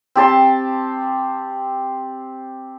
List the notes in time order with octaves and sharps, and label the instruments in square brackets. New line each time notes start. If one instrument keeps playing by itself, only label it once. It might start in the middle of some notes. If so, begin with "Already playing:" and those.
[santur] C4 G4 A5 C6